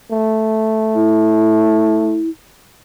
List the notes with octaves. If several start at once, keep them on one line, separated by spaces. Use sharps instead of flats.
A3
E4